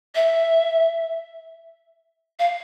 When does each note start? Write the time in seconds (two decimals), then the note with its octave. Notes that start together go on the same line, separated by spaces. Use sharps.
0.15 E5
2.39 F5